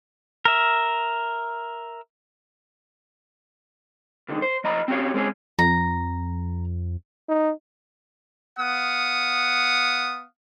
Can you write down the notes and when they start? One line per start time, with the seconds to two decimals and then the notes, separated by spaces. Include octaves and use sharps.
0.45 A#4 E5
4.29 C#2 D3 D#3
4.42 C5
4.64 F3 D#5 A#5 B5
4.88 C4 C#4 F#4 G4 C#5 F5
5.14 G#3 C4 C#4 G#4
5.59 F2 A#5
7.29 D#4
8.59 B3 F5 F#5 D#6